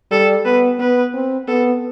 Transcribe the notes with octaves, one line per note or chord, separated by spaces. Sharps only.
G3 A4
B3 B4
B3 B4
C4
B3 A4